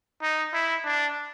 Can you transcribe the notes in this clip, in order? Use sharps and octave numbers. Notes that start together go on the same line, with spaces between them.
D#4
E4
D4